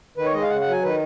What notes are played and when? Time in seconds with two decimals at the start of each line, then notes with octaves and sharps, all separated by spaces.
0.17 D#3 B4
0.25 C#5
0.33 G#3 D#5
0.42 F5
0.50 C#3 F#5
0.61 F#5
0.67 F#3 G#5
0.83 D#3 B4